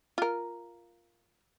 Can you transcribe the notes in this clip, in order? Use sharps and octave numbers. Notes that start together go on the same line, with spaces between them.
F4 A#4